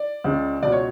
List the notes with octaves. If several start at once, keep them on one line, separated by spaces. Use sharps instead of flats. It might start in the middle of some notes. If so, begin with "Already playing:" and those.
Already playing: D5
C#2 C#3
C#2 B2 D5
C#5